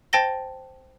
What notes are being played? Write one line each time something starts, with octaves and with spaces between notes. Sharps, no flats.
C5 G5 A5 A6 A#6 G7